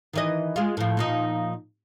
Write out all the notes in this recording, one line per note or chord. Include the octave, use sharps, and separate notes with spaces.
D#3 E3 D#5
G#3 F4
A2 F3
A#2 F3 D#4